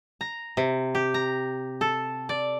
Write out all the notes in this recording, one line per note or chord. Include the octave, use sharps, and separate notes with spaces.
A#5
C3
G4
A#5
A4
D5